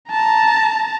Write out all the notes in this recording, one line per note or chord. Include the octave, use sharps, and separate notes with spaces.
A5 A#5